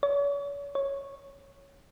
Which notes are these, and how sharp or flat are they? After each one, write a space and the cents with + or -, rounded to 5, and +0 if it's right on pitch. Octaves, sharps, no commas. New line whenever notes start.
C#5 +40
C#5 -5